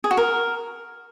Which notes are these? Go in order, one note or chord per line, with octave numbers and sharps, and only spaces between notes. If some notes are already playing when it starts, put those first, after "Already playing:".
G#4
F#4
A#4